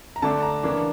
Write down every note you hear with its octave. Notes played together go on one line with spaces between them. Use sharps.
A#5
D3 A3 D4 A5
A#5
C#3 E3 A#3 D4